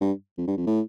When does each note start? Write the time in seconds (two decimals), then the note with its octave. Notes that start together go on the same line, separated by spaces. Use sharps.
0.01 G2
0.38 F2
0.47 G2
0.57 F2
0.67 A2